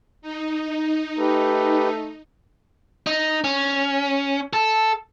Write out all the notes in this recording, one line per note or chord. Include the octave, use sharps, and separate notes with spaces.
D#4
A3 G4 B4
D#4
C#4
A4